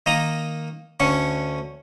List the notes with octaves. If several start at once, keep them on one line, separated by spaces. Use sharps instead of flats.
D#3 A#3 D#5 A#5
D2 D3 C#4 C#6